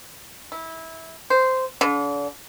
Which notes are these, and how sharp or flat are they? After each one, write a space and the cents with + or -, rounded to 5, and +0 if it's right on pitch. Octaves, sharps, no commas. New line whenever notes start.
E4 -20
C5 -10
D3 -40